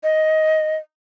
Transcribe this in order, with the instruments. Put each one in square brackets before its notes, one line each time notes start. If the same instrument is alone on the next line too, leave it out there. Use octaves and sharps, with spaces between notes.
[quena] D#5